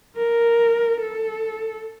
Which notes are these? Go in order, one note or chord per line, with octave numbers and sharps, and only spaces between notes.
A#4
A4